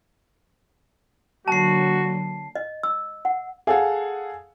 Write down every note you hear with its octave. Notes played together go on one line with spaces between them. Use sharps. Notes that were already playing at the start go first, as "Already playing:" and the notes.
D3 F#3 A#3 F#4 A5 C7
D#5
E6
F#5
G#4 A4 F5 F#5